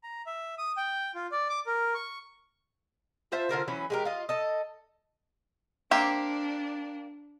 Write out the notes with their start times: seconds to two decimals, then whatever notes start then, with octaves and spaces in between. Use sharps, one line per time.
0.03 A#5
0.26 E5
0.58 D#6
0.77 G5
1.15 F4
1.32 D5
1.49 D6
1.66 A#4
1.94 C#6
3.32 F4 C5 E5 A5
3.49 D3 F4 A#4 C5
3.68 E3 F#3 C#4 B4
3.90 G#3 G4 A#4
4.05 F4 D#5
4.29 A4 D#5
5.91 A#3 C4 D4 G4